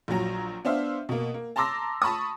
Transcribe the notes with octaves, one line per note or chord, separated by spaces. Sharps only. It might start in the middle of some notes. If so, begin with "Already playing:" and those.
A#1 A#2 F#3 A#5
B3 D4 C5 E5 F5
B2 A#3
A#3
A5 A#5 C6 D6 E6 A#6
A5 B5 C#6 D#6